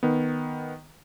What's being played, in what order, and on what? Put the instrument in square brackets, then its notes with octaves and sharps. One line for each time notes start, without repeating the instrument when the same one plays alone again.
[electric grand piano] D#3 B3